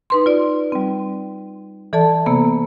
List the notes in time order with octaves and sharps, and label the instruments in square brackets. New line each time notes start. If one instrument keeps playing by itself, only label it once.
[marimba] D#4 B4 C6
F4 D5
G3 C4
E3 A4 D5 A5
C3 A#3 B3